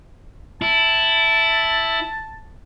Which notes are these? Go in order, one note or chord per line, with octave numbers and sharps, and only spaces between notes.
E4 A5